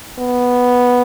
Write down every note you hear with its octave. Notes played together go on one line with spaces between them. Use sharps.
B3